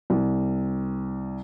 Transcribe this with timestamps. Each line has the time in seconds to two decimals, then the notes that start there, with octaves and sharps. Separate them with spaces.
0.10 C2